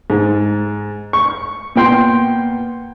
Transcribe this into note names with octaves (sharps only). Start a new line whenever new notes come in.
G#2
C#6
A#2 B3 G5 C6